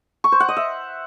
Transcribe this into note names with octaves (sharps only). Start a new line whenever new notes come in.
C#6
C5
F#5
D#5
E5